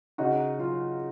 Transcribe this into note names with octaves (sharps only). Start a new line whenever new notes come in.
C#3 D#4 F#4
F#3 F4